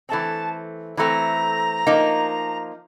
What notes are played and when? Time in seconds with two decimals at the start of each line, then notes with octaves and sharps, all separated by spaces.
0.09 E3 A3 C4 A5
0.97 E3 A3 C4 A#5
1.87 F3 A#3 D#4